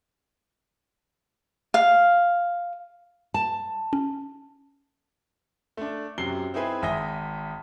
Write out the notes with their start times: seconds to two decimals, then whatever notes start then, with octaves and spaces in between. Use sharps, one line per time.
1.74 F5
3.34 A5
3.93 C#4
5.77 A3 D4
6.18 F#2 C3 F#4 C7 G7
6.54 C4 D#4 E4 G#4 B4
6.82 G#1 E5 G#5 D#6 A#6 G7